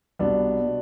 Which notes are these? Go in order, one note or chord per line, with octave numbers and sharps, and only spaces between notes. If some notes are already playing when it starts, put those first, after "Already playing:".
C2 B2 B3 D4
B2